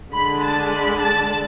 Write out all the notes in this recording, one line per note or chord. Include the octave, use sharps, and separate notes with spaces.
D3 G#3 D4 B5
A5
B5
A5